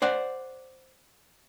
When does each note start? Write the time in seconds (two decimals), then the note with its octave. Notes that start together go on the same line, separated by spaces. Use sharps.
0.02 C5 D5 F#5